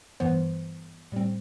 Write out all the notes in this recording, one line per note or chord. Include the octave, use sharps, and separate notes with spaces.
G2 E3 B3 C5
A2 G3 C4